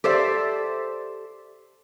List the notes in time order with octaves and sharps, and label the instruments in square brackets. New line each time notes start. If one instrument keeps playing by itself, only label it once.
[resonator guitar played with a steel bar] G4 A4 C5 D5 E5